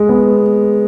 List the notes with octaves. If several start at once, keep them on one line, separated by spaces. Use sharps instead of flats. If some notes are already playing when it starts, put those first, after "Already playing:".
Already playing: G#3
B3